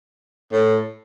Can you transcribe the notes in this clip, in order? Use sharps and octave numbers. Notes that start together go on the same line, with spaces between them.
A2